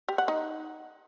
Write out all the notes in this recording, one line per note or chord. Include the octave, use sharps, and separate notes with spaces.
G4
F#5
D#4